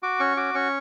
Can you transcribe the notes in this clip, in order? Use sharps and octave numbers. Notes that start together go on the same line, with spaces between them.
F#4 D6
C#4 C#6
F#4 D6
C#4 C#6